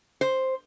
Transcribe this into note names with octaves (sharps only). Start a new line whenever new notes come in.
C5